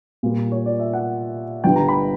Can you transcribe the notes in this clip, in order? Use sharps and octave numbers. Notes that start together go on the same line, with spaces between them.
A#2 G3 A#3
C#5
D5
E5
F#5
G1 G2 D3 G3 G5
A#5
B5